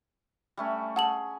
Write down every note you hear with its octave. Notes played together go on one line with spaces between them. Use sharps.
G3 A3 C#4
G#4 F#5 A5 F#7